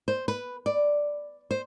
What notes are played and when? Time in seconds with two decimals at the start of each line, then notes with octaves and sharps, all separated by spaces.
0.08 C5
0.28 B4
0.66 D5
1.51 C5